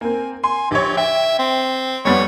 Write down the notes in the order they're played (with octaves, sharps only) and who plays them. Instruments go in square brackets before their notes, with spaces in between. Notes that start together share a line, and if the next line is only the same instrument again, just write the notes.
[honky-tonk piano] A#3 C4 [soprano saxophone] G#5
[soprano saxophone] G#5 [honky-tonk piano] C6
[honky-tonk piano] A#1 C#5 [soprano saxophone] G4
[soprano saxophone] E5 [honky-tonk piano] G5
[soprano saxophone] C4
[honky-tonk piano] F2 G3 B3 [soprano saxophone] C#5